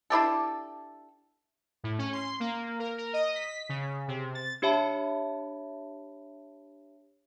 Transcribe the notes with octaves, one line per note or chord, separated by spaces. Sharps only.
D4 E4 G4 A4
A2
C#4
C6
A#3
A#4
A#4
D#5
B6
C#3
C3
A6
D4 G4 C#5 E5 A5 B5